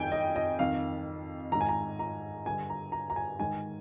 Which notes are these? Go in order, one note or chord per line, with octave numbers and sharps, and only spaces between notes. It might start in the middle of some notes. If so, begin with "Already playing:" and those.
Already playing: F2 D#3 G5 G#5
D#5
D#5
F2 D#3 F5
G#2 D#3 A#5
G#5
A#5
A#5
G2 D3 G#5
A#5
A#5
A#5
G#5
G#2 D#3 G#5